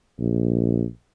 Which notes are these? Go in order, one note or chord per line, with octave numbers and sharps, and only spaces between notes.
A#1